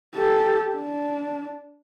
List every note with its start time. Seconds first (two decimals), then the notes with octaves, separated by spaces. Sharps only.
0.15 G4 A4
0.76 D4